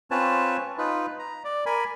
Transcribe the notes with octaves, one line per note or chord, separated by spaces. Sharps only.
C4 C#4 F4 B4 C#5 A5
D#4 F4 B4
A#5
D5
A#4 G#5 B5